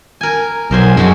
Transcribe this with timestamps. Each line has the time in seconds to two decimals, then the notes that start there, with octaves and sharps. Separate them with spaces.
0.21 A#4 G#5
0.71 B1 A#4 C5 G#5
0.97 F#2 G#3 F#4 A5